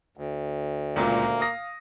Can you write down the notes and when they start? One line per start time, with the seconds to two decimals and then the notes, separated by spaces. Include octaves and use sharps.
0.17 D2
0.96 C#2 A#2 A#3
1.40 F5 D#6 A#6